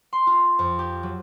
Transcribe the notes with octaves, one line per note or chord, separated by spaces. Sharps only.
C6
F4
F2
G4
F#3